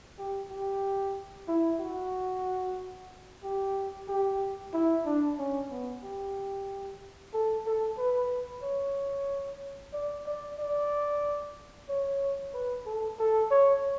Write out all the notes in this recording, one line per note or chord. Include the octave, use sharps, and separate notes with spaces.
G4
G4
E4
F#4
G4
G4
E4
D4
C#4
B3
G4
A4
A4
B4
C#5
D5
D5
D5
C#5
B4
A4
A4
C#5